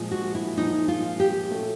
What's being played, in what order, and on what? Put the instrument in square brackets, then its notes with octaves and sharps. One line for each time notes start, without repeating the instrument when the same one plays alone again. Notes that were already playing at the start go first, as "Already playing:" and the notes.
Already playing: [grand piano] A#2 F3 G#3
[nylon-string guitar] F#4
E4
[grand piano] A#2 F3 G#3 [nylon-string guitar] D#4
[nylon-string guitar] F4
G4
[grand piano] A3 C#4 F#4 A4